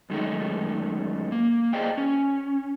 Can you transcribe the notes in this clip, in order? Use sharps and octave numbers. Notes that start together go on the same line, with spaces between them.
F#2 D#3 G#3 A3 D#4
A#3
G#4 C5 D5 D#5 F5 G5
C#4